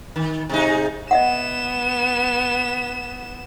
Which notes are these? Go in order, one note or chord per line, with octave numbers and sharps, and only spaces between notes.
D#3
C3 G#3 D#4
B3 D#5 E5 F#5 E7